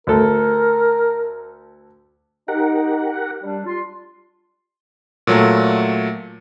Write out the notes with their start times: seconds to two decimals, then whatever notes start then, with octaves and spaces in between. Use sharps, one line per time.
0.07 D2 A4 A#4
2.48 D#4 G4 A#4 F#5
3.44 G3 D4
3.66 G3 F4 C6
5.27 A#2 F#3 A3